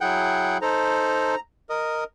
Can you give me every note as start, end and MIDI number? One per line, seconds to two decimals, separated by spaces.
0.01 0.58 54
0.01 0.58 64
0.01 0.58 68
0.01 0.57 78
0.01 0.57 79
0.62 1.35 63
0.62 1.35 69
0.62 1.35 72
0.62 1.40 82
1.70 2.04 70
1.70 2.04 75